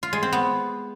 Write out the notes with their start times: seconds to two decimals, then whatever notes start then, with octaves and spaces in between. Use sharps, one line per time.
0.03 F4
0.13 G#3
0.23 C4
0.32 B3